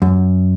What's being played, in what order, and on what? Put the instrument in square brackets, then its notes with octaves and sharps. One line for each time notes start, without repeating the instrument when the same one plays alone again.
[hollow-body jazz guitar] F#2